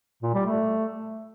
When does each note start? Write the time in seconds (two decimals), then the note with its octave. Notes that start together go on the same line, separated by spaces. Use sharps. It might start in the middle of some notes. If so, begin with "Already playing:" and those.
0.23 A#2
0.34 G3
0.46 A3